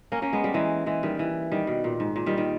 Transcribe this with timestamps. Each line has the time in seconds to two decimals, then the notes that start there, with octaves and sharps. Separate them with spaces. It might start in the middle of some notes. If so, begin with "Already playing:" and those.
0.12 A#3 C#4
0.22 A#3 C#4
0.33 G#3 B3
0.44 G3 A#3
0.54 E3 G#3
0.86 E3 G#3
1.03 D#3 G3
1.19 E3
1.52 D#3 G3
1.67 B2
1.84 A#2
2.00 G#2
2.16 A#2
2.26 D#3 G3
2.38 D#3